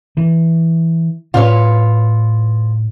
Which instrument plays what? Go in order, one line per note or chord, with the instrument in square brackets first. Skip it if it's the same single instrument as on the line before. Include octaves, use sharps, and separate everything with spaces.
[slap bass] E3
[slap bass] A2 [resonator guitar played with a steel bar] F4 B4 C#5